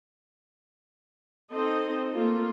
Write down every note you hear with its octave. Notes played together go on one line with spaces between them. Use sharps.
C4 D#4 A4 C5 D#5
A3 A#3 F4 A4